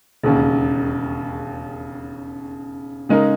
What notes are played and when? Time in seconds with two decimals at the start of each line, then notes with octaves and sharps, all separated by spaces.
0.24 E1 D#2 C#3
3.09 C#3 G#3 D#4 A#4